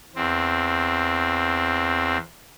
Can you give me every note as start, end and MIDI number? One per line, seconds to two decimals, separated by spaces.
0.15 2.17 40
0.15 2.17 60